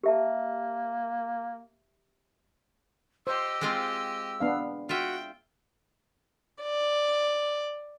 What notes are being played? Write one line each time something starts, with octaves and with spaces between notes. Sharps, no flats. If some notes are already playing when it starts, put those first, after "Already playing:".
A#3 G4 E5 A5
G4 C5 D#5 E6
G#3 C4 F4
B3 D4 F5
F4 F#4 E5 G5
D5